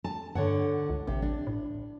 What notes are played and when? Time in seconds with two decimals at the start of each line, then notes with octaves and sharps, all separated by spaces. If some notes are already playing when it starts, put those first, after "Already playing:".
0.04 A5
0.35 G2 D3 C#5 F#5
0.89 C#2
1.07 A1 C3
1.22 D4
1.47 A2